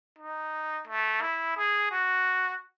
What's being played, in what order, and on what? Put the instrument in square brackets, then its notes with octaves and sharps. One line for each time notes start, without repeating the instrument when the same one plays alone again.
[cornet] D#4
A3
E4
G#4
F#4